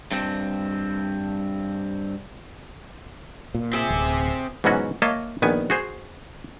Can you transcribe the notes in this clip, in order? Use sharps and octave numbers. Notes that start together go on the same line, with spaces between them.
G2 C4
A#2
C4 G#4 E5
D1
G#2 B2 E3 F#3 C#4 F#4
A#3 C#5 D#5 E5 A5
A#1 D#3 B3 G#5
F#4 G#4 C5